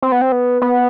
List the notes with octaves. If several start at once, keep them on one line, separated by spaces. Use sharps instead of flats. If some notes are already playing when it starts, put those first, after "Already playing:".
C4
B3
C4
B3
B3